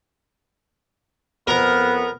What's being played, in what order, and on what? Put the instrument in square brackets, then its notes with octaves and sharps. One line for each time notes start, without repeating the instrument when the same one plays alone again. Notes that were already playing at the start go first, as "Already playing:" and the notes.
[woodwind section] F2 B3 [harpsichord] A#4 A#5